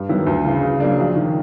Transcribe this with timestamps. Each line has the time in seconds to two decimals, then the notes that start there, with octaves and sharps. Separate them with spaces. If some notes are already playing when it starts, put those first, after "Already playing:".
Already playing: G2
0.09 D#3 F#3 B3 E4
0.27 D2
0.45 C#3 E3
0.63 C#3
0.80 F#3 A#3 D4
0.99 A#1
1.16 D#3